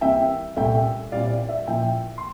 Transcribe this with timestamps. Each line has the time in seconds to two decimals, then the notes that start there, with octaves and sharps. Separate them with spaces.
0.01 C2 C3 E3 A#3 E4 E5 G5
0.56 C2 A#2 A3 E5 G5
1.12 A#2 G3 C4 E4 D5 F5
1.31 D5
1.49 E5
1.67 A#2 F3 A#3 E4 E5 G5
2.18 C6